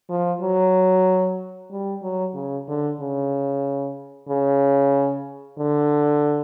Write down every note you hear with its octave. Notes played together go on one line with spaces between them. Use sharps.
F3
F#3
G3
F#3
C#3
D3
C#3
C#3
D3